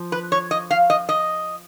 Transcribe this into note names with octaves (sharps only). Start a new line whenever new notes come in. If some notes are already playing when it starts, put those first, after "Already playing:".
Already playing: F3
B4
C#5
D#5
F5
D#5
D#5